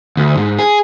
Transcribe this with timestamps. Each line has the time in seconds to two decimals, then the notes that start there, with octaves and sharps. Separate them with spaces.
0.17 D2
0.37 G#2
0.59 G#4